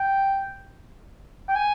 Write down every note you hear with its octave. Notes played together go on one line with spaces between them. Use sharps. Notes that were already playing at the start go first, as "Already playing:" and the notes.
Already playing: G5
G5
G#5